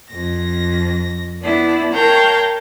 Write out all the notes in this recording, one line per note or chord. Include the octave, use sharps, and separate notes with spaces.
F2 A#6
B3 D4 E4
A#4 C#5 F5 G5 A5 A#5